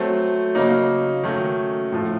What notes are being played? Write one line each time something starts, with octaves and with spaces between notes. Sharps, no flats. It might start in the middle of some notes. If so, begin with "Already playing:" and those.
Already playing: F#3 A3 C4
C#3 F#3 A#3 D#4
D#3 F#3 A3 C#4
A2 F3 A3